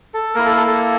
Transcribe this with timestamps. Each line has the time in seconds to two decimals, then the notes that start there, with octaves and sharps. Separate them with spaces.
0.14 A4
0.35 A#3 E4 A#4
0.46 A4
0.57 A4
0.67 A4